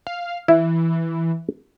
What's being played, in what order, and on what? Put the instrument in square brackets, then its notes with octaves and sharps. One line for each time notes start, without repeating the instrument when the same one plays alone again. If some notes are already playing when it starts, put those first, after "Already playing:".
[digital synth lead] F5
[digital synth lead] E3 [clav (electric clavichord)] E4